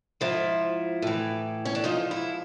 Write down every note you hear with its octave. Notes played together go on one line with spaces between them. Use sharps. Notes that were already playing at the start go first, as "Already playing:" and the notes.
G#2 F3 E4
A2 E3
C#4
D4
G#2 F3 D#4
E4